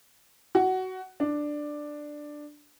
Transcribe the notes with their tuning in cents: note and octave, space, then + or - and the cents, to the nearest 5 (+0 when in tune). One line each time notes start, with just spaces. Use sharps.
F#4 +15
D4 +10